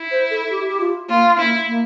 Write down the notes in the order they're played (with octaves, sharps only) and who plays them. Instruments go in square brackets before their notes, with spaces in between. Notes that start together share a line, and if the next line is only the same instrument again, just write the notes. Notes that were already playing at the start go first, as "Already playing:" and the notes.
Already playing: [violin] E4
[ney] C5
A4
G4
G4
F4
[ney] A#3 [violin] F4
[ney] A#3 [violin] E4
[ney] A#3